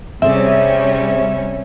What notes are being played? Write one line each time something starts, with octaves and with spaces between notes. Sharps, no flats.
C3 G3 C4 C#4 G#4 D5 E5